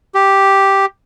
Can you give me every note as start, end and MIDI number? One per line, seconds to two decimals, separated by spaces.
0.15 0.86 67